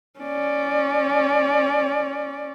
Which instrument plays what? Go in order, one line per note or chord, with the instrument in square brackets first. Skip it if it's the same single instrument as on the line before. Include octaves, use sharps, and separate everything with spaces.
[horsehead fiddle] C#4 D5